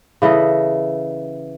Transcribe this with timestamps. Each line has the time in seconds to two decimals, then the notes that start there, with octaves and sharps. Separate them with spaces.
0.22 C#3 E3 A4 D#5